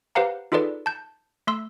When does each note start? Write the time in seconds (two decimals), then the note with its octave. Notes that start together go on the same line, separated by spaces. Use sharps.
0.15 G4 B4 C5 F5 F#5 A#5
0.52 D#4 F4 G#4 A4 B4 D5
0.86 A5 G6
1.47 A3 C6 E6